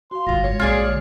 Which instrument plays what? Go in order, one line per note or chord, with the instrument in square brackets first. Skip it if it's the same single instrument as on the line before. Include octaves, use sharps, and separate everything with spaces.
[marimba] F#4 F5 [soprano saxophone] C6
[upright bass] G1 D3 [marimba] G3 A#6 [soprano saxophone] F4
[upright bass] G#2 E3 [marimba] G#3 [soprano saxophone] C#5
[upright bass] A#1 A#2 [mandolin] F4 G#4 D5
[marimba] D3